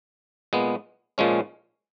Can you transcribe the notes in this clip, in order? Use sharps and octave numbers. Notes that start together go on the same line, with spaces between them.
A#2 G#3 B3
A#2 F3 G#3 C#4